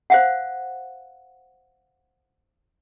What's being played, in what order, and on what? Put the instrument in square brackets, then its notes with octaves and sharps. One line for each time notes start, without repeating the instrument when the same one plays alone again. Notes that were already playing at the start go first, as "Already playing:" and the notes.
[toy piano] C5 F5 F#5